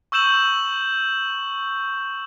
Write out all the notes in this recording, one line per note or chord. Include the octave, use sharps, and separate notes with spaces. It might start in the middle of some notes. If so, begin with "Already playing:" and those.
C#6 E6 G6 E7 F#7